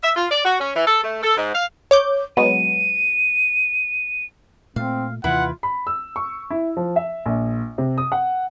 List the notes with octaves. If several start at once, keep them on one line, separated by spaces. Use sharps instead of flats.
E5
F4
D5
F#4
C#4
E3
A4
A3
A4
G#2
F5
C#5 D6 G6
F#3 G#3 B3 D#7
A#2 A3 C4 F5
D#2 C3 E3 E4 F4 B4 F#5
B5
E6
C#6
E4
F3
E5
A#1
C3
D#6
F#5